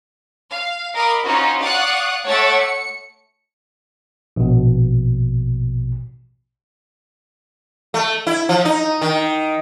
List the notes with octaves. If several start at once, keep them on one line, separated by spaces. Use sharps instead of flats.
F5
A#4 D#5 F5 B5 D6
C#4 D#4 F4 F#4 C5
D5 F5 F#5 C#6 D#6 F#6
A3 C#5 F#5 D6 E6 A6
C#7
A#1 B2
A3
E4
F3
D#4
D#3